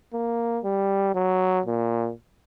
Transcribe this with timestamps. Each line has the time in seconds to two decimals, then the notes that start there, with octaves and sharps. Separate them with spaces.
0.13 A#3
0.64 G3
1.15 F#3
1.66 A#2